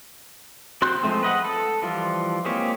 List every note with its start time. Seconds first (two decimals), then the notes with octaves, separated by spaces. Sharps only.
0.82 C4 F#4 C6 F#6 G6
1.03 F3 G#3 A3 C4
1.23 B4 D#5 F#5
1.45 A4
1.82 E3 F3 G3 F4
2.45 G#3 A#3 C4 G4 C#5